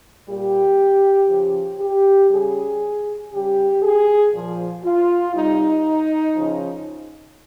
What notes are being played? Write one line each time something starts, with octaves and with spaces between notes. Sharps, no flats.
A#2 G3 G4
C#3 F3
G4
C#3 G3 G#4
C#3 G3 G4
G#4
A#2 F3
F4
C3 G3 D#4
C#3 F3